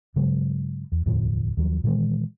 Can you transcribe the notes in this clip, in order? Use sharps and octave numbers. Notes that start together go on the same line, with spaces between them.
G2 C#3 F#3 G#3
E2
E1 D2 A2 F3
D#2 F3 F#3
A#2 D#3 E3 G#3